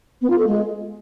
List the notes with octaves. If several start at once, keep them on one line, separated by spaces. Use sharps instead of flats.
B3
F4
A4
G#3